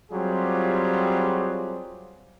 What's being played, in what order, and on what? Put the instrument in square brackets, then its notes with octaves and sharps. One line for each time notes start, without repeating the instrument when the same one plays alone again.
[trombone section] F#3 G3 C4 F4 G4 G#4